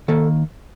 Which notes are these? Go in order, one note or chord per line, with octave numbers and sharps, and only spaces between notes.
D#3 A#3 A4